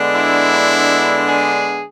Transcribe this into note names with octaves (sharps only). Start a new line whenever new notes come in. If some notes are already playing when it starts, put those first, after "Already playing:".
Already playing: D3 G#3 B3 D4
E4
G#4